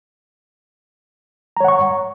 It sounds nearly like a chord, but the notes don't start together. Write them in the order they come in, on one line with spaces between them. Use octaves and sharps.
A#5 C#5 F#5 C#6